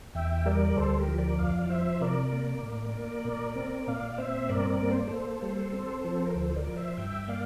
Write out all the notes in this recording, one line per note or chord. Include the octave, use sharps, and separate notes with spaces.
E2 E5 G5
G3 A#4 D5
D2 A4 C5
G4 A#4
F3
A#4 D5
F2 D5 F5
D5
F3 C5 E5
C3 A#4 D5
A#3
A2
A#3
A#2
C4
A#2 D5 F5
C4 C5 E5
G2 A#4 D5
A#4 D5
A#3
C5
D5
A#3 A4 C5
G3
C4
F3
A#4
D2 A4 C5
A#4 D5
F3
C5 E5
G2 E5 G5
A#3 D5 F5